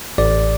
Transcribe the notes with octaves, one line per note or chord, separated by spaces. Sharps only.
A1 D5